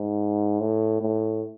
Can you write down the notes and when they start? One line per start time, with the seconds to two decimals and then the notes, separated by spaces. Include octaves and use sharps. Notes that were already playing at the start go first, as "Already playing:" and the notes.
Already playing: G#2
0.60 A2
1.01 A2